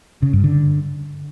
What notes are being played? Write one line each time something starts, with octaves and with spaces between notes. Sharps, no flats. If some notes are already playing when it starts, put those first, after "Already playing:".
C#3
G2
D3